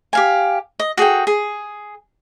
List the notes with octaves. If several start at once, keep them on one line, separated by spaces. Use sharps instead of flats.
G4 F5 G#5
D#5
F#4 G#4 A4 G5
G#4